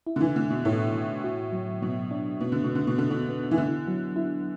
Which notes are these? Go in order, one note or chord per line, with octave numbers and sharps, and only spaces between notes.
E4
D3
E3
D3 A3
B2
A2 A4
E3
F#4
F#3
B2 F#3
D4
B2 B3
D3
B2
B3
D3
B2
D3 A4
B2
B3
E3
D3 E4
F#3
E4